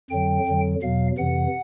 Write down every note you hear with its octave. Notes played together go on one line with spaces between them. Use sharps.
F2 D3 F#3 G5
F2 D3 F#3
E2 B2 F#3 F5
F2 C3 E3 F#5